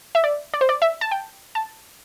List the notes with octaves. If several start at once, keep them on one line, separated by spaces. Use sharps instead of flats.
E5
D5
D5
C5
D5
E5
A5
G5
A5